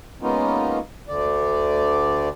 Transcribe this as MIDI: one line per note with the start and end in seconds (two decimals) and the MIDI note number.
0.22 0.79 56
0.22 0.79 58
0.22 0.79 59
0.22 0.79 61
0.22 0.79 63
0.22 0.79 65
1.09 2.29 38
1.09 2.29 50
1.09 2.29 74